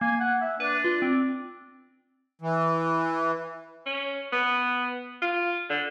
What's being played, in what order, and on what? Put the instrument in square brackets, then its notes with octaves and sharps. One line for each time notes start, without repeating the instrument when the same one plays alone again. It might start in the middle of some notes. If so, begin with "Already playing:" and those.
[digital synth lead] A#3 [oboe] G#5
[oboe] F#5
E5
[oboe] D4 [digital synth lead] B4
[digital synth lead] F4
C4
[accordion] E3
[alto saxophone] C#4
B3
F4
D3